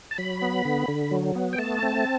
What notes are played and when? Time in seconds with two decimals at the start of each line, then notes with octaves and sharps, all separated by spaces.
0.11 A5
0.18 F#3 B5
0.42 B3
0.65 D3
0.88 D3
1.11 F#3
1.35 B3
1.53 G5
1.58 A3 A5
1.83 C4